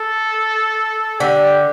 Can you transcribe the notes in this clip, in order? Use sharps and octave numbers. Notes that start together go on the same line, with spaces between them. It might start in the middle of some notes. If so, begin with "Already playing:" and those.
Already playing: A4
D3 G4